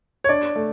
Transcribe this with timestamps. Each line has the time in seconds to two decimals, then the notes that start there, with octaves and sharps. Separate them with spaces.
0.24 C#5
0.29 D4 D5
0.56 A3